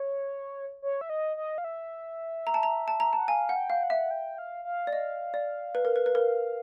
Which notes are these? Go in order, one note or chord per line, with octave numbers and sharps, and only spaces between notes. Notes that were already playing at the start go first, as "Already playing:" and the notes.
Already playing: C#5
C#5
E5
D#5
D#5
F5
E5
A#5
A5
A#5
A5
A#5
F#5 A5
F5 G#5
F#5
G5
F5
F#5
E5
G5
F5
F5
D5
D#5 F5
D5
B4
A#4
B4
B4
A#4